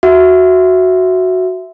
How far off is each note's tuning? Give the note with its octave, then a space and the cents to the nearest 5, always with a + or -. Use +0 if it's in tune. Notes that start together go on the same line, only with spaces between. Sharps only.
F#4 +0 E5 +0